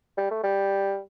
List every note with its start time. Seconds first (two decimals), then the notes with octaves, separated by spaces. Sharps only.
0.18 G3
0.31 A3
0.43 G3